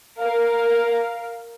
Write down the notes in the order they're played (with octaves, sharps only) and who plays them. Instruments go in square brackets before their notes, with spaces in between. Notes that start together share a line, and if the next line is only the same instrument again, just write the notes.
[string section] A#4 F5